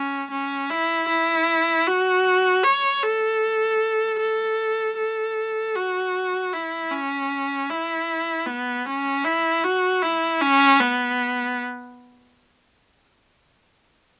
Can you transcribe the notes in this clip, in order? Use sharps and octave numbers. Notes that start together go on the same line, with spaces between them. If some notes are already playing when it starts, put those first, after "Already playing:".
Already playing: C#4
C#4
E4
E4
F#4
C#5
A4
A4
A4
F#4
E4
C#4
E4
B3
C#4
E4
F#4
E4
C#4
B3